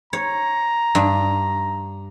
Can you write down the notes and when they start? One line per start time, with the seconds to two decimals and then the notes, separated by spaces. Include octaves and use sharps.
0.13 C#5 A#5
0.95 G2